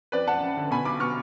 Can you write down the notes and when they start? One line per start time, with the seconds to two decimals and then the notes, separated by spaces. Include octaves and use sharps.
0.12 F2 B4 D5
0.27 F#1 F#5 A5
0.43 F#1
0.57 D3
0.71 B2 G#5 B5
0.85 B1 B5 D6
1.00 B2 C#6 F6